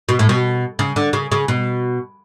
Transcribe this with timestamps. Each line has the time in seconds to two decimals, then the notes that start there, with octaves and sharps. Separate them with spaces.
0.09 B2
0.19 A2
0.29 B2
0.79 C#3
0.96 D3
1.13 C#3
1.32 C#3
1.48 B2